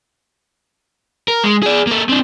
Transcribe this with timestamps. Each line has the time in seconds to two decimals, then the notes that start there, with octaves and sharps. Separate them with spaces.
1.28 A#4
1.44 G#3
1.63 G#4 D5
1.87 A#3 A4
2.09 C4 D4